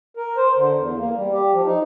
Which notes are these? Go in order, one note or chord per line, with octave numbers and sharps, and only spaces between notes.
A#4
C5
D3
E2
A#3
G3
G4
F3
D#4